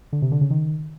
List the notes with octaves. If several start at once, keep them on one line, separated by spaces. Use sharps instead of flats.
D3
C3
D3
C#3
D#3